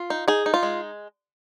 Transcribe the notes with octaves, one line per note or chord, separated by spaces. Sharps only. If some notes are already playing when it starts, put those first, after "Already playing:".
Already playing: F4
D#4
D#4 G#4
D#4
F4
G#3